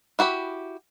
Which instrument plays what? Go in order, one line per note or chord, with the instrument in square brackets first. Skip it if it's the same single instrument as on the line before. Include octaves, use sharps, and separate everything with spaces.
[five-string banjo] E4 F#4 G4 B5